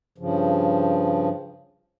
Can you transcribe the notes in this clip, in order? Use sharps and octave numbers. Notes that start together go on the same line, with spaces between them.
G2 C#3 F3